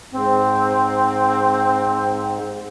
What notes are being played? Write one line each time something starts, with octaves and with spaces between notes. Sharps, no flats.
G#2 C4